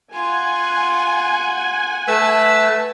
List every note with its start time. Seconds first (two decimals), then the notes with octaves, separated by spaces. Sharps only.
0.13 F4 F#5 G#5
2.08 A3 B4 A5 E6